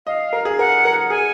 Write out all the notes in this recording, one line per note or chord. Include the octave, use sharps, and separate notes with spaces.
D#5 F5
A#4
G#4
A#4 F#5
A#4
G#4 G#5